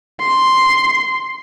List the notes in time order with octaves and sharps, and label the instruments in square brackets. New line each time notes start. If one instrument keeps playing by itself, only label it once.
[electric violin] C6